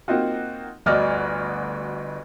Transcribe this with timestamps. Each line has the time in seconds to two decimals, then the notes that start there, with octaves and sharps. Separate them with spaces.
0.08 A#3 C4 D#4 F4 F#4
0.86 G1 D2 F#4 D5 D#5 F6